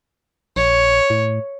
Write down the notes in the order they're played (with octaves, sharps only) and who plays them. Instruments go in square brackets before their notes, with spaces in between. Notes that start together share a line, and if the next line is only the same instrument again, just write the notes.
[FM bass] A#1 [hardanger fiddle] C#5
[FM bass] A2